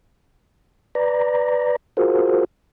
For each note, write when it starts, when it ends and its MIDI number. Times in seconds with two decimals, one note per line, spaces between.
0.95 1.76 71
0.95 1.76 74
0.95 1.76 82
1.97 2.45 65
1.97 2.45 66
1.97 2.45 68
1.97 2.45 70
1.97 2.45 72